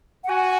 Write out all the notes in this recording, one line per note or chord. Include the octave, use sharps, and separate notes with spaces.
F#5
F#4 G#5